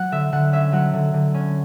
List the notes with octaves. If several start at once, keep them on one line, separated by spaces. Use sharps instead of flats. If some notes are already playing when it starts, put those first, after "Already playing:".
Already playing: F#3 F#5
D3 E5
D3 F#5
C#4 E5
F#3 F#5
D3
D3
C#4